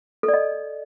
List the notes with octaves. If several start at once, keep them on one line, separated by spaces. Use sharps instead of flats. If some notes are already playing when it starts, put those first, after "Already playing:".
A4
D5
D#5